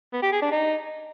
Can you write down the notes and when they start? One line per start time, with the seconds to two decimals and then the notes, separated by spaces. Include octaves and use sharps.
0.13 B3
0.22 G4
0.32 G#4
0.42 D4
0.51 D#4